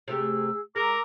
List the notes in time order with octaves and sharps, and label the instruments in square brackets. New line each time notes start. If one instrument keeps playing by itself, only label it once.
[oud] C3 A3 G4 [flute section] G#4 E6
[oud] G#3 [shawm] A#4 [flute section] A#5 D6 E6